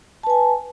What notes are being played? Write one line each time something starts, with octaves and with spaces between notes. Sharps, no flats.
B4 G#5 A5